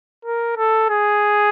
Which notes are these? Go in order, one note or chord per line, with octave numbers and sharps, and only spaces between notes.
A#4
A4
G#4